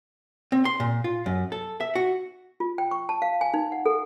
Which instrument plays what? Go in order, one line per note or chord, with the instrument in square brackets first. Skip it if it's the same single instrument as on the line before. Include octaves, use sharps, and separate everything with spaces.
[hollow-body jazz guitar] C4
C6
A#2
F4
F#2
A4
E5
F#4
[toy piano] F4
G5
C#6
A5
F5
G#5
D#4
F#5
A4